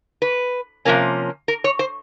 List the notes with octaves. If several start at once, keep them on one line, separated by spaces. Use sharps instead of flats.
B4
C3 F3 A#3 C#4
A#4
C#5
C5